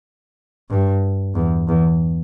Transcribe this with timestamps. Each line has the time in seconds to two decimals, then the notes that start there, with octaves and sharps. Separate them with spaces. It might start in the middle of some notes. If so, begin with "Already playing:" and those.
0.70 G2
1.35 E2
1.69 E2